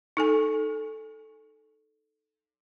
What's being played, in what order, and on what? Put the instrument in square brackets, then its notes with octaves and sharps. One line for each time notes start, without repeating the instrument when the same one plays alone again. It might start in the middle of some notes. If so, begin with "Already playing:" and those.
[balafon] D#4 A4 G#5